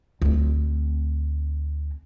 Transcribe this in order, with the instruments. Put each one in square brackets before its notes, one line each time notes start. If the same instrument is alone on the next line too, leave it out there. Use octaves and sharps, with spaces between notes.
[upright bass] D2 C4